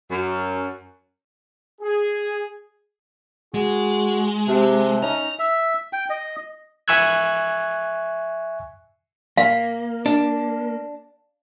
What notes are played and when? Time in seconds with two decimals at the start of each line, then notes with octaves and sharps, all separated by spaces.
0.11 F#2
1.81 G#4
3.54 G#3 F#4 G#4
4.48 C3 E5 A5 F#6
5.03 C#4 D#4 A#5
5.39 E5
5.93 G5
6.10 D#5
6.88 E5 G#5 C#6 E6 F#6 G#6
9.37 A#3 F5
10.06 D4